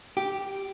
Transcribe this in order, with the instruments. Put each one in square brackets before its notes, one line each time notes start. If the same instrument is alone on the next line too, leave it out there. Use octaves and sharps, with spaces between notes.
[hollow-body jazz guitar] G4